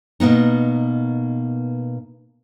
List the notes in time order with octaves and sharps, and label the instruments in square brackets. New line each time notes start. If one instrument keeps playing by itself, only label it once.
[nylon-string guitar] B2 A#3 B3 D#4